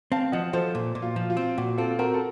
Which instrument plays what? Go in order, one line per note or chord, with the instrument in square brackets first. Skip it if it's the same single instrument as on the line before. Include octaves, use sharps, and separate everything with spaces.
[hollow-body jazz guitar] C4 [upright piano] F5 A5
[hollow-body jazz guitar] F3 [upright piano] D#5 F#5
[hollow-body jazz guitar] F3 [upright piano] A4 C5
[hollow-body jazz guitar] A#2
A#2
[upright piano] F4
[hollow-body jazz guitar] F3
[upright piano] F4
[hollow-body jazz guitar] C4
[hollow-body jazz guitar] A#2 [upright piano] F#4
[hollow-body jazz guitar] C4 [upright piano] F4 A4
[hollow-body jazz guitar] C4 [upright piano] F#4 A#4
[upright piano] A4